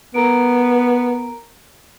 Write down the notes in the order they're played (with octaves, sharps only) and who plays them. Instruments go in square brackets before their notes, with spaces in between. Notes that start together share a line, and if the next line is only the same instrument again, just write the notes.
[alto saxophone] B3 [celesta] A#4 A#5 D7